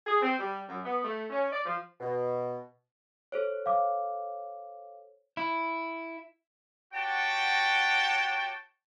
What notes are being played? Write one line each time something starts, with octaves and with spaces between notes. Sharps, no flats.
G#4
C4
G3
F#2
B3
A3
C#4
D5
F3
B2
A4 C5 C#5
F5 D6
E4
F#4 G4 C#5 F#5 G5 A5